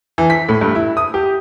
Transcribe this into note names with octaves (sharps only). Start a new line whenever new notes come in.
E3
B6
A2
G2
E4
D#6
G4